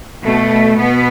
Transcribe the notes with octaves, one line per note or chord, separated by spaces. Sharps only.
B2 A3
B2 B3